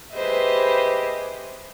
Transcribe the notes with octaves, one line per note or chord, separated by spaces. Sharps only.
G4 G#4 B4 C5 D#5 E5